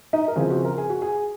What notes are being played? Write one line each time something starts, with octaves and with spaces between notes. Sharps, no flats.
D#4 D#5
A#4
C#3 F3 C4 F4 G#4
F#4
A#4
G#4
F#4
G#4